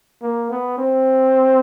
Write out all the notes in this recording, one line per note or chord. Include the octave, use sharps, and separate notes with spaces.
A#3
B3
C4